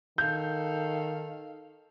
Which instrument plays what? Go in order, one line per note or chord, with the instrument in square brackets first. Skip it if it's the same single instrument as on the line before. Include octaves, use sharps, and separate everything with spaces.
[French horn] D#3 [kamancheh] A4 F5 [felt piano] G6